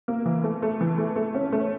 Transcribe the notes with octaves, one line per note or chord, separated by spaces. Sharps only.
A#3
E3
A3
A3
E3
A3
A3
C#4
A3